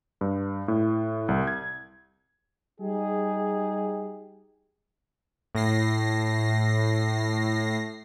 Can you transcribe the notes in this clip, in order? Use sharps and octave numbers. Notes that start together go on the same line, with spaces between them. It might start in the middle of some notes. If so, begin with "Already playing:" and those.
G2
A2
C2
G#6
G3 D#4 G4 G#4
A2 A#6 C7